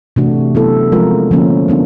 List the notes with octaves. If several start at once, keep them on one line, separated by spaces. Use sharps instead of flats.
C3 E3 A3 D4 F#4
F#3 B3 E4 A4
F3 G#3 C4 F4 A#4
D3 F3 A#3 C#4
G3 B3 D4